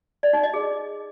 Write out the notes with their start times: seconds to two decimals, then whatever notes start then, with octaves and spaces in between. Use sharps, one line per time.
0.23 D5
0.33 D#4
0.43 D#5
0.54 G#4